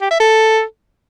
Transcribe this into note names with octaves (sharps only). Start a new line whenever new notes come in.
G4
E5
A4